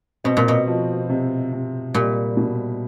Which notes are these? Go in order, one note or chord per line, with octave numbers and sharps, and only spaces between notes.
B2 C4
A#2
B2
F3
C3
C3
A#2 G3
B2